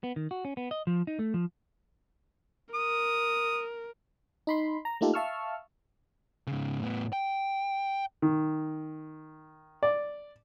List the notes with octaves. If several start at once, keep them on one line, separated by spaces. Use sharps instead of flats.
B3
D#3
F#4
C#4
B3
D#5
F3
D#4
A3
F3
A#4 D#6
D#4 B5 C6
A#5
A3 A#3 D#4 F4 G4 A4
E5 F5 A5 C#6 E6 F6
G#2 C#3
A2 B3
G5
D#3
D5